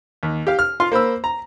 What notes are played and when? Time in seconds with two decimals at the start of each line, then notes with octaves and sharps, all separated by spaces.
0.23 D#2
0.47 G4 F5
0.59 F6
0.80 F4 F5 C6
0.92 A#3 C5 B5 E6
1.24 A#5